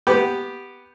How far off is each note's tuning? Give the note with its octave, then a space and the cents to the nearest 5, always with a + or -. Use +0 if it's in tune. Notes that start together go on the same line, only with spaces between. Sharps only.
B3 +0 G4 +0